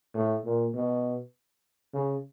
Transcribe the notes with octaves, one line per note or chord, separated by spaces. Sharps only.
A2
A#2
B2
C#3